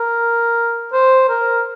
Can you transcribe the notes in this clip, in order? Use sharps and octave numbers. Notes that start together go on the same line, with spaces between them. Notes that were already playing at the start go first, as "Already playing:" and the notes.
Already playing: A#4
C5
A#4